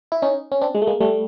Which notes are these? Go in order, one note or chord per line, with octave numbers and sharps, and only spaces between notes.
E4
C#4 D#4
C#4
C4 D4
G#3
A3
G#3 A#3
G3 A3